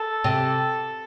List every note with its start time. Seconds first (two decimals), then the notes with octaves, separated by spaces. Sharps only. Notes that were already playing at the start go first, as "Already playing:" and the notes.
Already playing: A4
0.24 C3